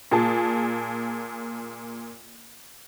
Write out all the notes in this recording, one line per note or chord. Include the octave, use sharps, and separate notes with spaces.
A#2 G#4 A5